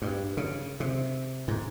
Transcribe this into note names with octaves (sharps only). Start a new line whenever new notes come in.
G2
C#3
C3
G#2